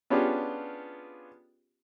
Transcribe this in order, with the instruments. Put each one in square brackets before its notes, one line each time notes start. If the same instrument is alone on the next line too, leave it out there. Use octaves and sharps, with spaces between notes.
[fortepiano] B3 C#4 D4 F4 G4 G#4